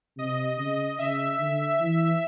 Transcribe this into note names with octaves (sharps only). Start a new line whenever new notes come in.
C3 D#5
C#3 D#5
C#3 E5
D3
E3